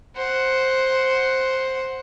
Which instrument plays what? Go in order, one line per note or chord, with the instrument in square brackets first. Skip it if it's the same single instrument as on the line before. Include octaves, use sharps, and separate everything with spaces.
[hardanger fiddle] C5 F#5